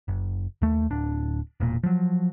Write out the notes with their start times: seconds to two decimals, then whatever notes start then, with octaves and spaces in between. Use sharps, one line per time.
0.08 F#1
0.62 D#2 A3
0.91 D1 D4
1.60 E1 A#2
1.83 F3 F#3